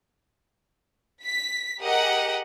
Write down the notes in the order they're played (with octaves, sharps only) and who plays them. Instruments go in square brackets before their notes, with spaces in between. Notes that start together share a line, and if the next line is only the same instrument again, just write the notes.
[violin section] B6
G4 G#4 A#4 D#5 F#5